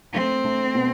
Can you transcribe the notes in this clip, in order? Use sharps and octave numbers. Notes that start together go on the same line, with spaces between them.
A3 C4
A3
B2